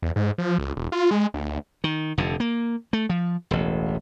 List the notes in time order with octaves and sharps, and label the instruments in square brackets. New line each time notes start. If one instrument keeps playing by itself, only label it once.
[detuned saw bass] E2
G#2
F3
C#2
E1
F4
G#3
D2
[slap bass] D#3
F1 F2 D3
A#3
A3
F3
E1 A1